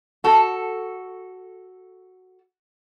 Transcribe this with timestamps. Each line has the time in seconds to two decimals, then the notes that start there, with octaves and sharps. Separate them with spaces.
0.24 F#4 A4